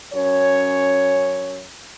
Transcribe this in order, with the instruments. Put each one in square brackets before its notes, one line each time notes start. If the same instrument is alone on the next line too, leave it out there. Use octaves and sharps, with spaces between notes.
[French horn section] F#2 C#4 C#5